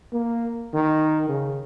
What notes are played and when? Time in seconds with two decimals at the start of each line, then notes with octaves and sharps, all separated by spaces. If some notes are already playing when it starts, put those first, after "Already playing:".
0.13 A#3
0.74 D#3
1.28 C#3